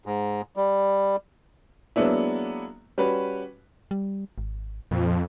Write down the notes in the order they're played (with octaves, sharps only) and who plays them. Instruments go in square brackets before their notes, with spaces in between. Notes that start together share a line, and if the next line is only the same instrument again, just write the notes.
[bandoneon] G#2
G3
[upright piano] F#3 G#3 A#3 B3 D4 E4
G3 C#4 F#4 B4
[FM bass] G3
G#1
[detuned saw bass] F2 [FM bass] A#2